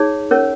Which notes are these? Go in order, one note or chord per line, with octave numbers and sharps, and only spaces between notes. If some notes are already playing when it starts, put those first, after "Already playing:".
Already playing: D#4 G#4 C#5
C#4 A#4 C#5